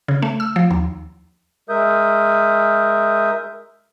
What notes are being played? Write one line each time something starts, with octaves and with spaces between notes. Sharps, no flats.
C#3
A3
E6
F3
D#2
G#3 A#4 E5 D#6 G6